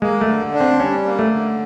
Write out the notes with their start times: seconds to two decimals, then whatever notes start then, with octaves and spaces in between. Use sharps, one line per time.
0.02 G#3 A#3
0.21 A3
0.28 D3
0.54 D4
0.60 C4
0.80 G3 C#4
1.06 A#3
1.19 A3
1.32 D3